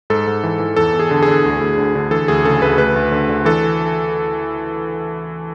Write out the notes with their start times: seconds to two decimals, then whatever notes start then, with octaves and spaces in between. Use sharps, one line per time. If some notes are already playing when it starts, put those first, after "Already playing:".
0.10 G#2 A4
0.27 G#2
0.44 E3
0.60 E3
0.76 E2 A4
0.93 E2
0.99 G#4
1.11 D3
1.22 G#4
1.28 D3
1.45 D2
1.61 D2
1.78 D3
1.95 D3
2.11 E3 A4
2.28 D2 G#4
2.44 C#3 A4
2.62 D2 B4
2.78 D2 B4
2.96 D2
3.12 D3
3.29 D3
3.45 E3 A4